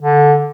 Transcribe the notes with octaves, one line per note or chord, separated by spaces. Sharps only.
D3